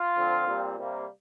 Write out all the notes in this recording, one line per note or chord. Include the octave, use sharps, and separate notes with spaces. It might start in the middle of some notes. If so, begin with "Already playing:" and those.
Already playing: F4
D3 F3 C4
A#2 G3 C4
C3 G3 A#3